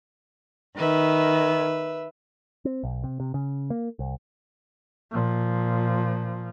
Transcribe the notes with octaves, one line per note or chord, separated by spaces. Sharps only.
D#3 B4 E5
C4
B1
C3
C3
C#3
A#3
C2
A#2 F3